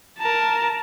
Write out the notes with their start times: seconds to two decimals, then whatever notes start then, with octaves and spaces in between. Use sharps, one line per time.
0.19 A#4 A5